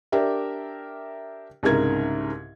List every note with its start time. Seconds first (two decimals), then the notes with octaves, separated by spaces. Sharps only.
0.12 D4 G4 A#4 E5
1.63 C2 G#2 C#3 A#4 G#6